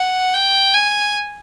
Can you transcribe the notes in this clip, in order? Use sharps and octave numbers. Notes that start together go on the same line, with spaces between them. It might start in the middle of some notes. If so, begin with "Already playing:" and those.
Already playing: F#5
G5
G#5